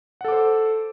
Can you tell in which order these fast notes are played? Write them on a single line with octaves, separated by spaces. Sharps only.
F#5 A4 D6 C5